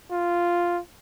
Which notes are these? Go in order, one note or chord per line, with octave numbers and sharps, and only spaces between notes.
F4